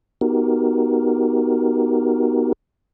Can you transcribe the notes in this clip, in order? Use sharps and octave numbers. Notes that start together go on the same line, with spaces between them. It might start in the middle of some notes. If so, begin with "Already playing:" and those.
B3 D#4 F#4 G4 A#4